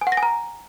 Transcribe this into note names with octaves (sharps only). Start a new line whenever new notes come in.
G#5
F#5
A#6
G#5
A#5